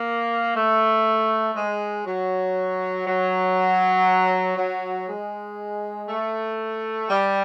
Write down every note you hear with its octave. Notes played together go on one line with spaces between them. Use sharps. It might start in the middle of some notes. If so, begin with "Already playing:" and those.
Already playing: A#3
A3
G#3
F#3
F#3
F#3
G#3
A3
G3